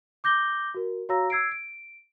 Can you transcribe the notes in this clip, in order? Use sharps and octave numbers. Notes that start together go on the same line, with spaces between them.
D6 G6 A#6 G7
F#4 A#4
F#4 C#5 F5 A#5 E6 A#6
E6 G#6 C7 D7
D7